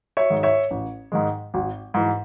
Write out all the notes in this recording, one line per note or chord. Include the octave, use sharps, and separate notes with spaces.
C#5 E5
G#2 D#3 G#3
C#5 E5
A1
G#2 D#3 G#3
G#1
G#2 E3